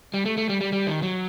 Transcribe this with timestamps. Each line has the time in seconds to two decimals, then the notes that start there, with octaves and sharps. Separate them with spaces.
0.14 G3
0.25 A3
0.37 A3
0.49 G3
0.61 G3
0.72 G3
0.87 D#3
1.02 F#3